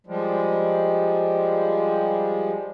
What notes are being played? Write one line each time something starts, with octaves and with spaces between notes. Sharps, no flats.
F3 G3 G#3